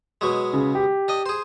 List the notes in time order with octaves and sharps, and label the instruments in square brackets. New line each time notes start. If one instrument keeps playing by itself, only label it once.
[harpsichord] B2 F#3 G#3
[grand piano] C#3
G4
[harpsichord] D4 D#5
G#4 C5